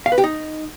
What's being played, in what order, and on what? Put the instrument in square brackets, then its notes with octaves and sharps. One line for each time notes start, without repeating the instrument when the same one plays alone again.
[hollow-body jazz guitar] F5
B4
G4
D#4